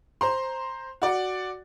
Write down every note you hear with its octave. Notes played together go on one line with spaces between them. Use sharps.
C5 A#5 C6
F#4 D5 F#5